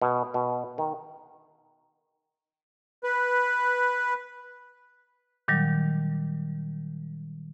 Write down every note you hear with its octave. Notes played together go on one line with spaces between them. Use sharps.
B2
B2
D#3
B4
A#2 D#3 F#3 G3